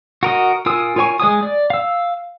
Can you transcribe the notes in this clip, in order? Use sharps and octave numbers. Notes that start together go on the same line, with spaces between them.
F#4 A#4 D#5
F4 A#4 G#5 D#6 E6
F4 A#4 C#5 G#5 C#6
G#3 C#5 G#5 D#6
D5
F5 E6